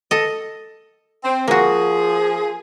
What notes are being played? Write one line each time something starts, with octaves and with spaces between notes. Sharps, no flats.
A4 D#5
C4
F3 A#3 F#4 G#4